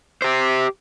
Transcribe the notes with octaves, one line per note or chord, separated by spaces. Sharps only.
G4 C5